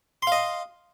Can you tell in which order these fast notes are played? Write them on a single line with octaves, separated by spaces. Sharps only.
C6 F5 D#5